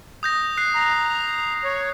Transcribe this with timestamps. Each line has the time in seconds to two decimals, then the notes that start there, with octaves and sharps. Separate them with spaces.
0.23 D#6 G6 A#6
0.58 F#6 C7
0.75 A#5
1.64 C#5